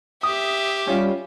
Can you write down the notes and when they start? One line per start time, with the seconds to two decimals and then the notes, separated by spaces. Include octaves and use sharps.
0.23 G4 E5 D#6
0.87 G3 C#4 F4